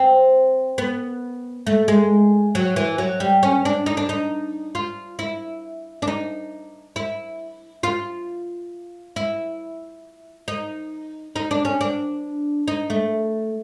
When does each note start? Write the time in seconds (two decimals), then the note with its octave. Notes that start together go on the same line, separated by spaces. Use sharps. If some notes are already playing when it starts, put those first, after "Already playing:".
Already playing: C4
0.78 B3
1.67 A3
1.88 G#3
2.55 F#3
2.76 E3
2.98 F#3
3.20 G3
3.43 C#4
3.65 D4
3.86 D#4
3.97 D4
4.09 D#4
4.75 F4
5.19 E4
6.02 D4
6.08 D#4
6.96 E4
7.83 F4
9.16 E4
10.48 D#4
11.36 D#4
11.51 D4
11.65 C#4
11.81 D4
12.68 D#4
12.90 A3